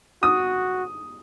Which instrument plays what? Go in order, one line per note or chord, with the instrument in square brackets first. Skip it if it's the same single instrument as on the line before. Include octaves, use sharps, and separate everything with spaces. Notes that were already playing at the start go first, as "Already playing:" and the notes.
[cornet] F#4 [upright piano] D#6